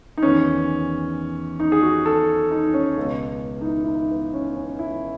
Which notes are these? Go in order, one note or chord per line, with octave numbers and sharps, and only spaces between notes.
D#4
E2 D#3 C#4
D#4
G#4
F#4
A4
D#4
C#4
C#2 B2
D#4
E4
E4
D#4
B3
C#4
C#4
E4